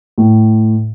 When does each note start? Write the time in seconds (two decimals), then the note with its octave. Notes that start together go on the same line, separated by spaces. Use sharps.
0.18 A2